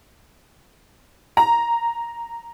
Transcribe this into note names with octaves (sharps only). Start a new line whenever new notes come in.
A#5